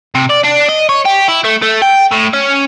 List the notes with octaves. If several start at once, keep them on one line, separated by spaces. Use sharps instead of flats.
C3
D5
D4
D#5
C#5
G4
E4
A3
A3
G5
A2
C#4